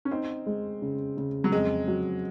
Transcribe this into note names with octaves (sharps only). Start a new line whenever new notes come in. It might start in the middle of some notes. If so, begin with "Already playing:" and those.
C#4
C4 D#4
G#3
C#3
C#3
F#3
F2 G#3
F#3